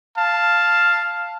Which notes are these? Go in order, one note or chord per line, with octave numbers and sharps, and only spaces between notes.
F5 A5